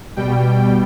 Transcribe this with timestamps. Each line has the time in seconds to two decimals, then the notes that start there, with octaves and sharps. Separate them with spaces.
0.16 B2 G3 G5